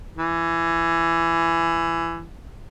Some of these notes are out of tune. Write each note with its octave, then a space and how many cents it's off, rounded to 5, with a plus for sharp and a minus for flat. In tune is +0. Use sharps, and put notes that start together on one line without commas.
E3 +20